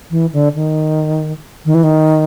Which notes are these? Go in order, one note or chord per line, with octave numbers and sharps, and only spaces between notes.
E3
D3
D#3
D#3
E3
D#3